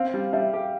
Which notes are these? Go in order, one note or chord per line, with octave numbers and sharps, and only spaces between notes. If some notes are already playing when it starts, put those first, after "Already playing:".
Already playing: C4 F5
G3
G3 E5
G4